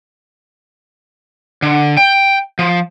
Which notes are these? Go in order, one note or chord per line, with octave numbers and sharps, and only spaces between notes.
D3
G5
F3